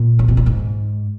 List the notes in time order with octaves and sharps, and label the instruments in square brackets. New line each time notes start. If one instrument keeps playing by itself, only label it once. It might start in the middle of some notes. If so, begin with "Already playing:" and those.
Already playing: [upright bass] A#2
C#3
B2
A#2
G#2